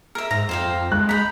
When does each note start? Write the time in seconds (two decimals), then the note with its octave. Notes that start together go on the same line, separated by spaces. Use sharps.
0.15 A#4 E5 F6
0.31 G#2 A#5 A#6
0.49 F2 C5 F5 G5
0.92 G#3 F#6
1.09 A#5 B5 G6 B6